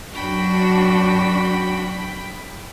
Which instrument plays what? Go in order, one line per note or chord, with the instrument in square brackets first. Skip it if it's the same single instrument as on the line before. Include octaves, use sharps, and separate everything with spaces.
[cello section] F#2 D4 F#4 [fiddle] G5 B5